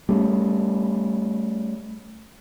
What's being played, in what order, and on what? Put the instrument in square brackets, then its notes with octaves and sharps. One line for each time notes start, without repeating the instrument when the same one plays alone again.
[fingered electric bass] G3 A3 C#4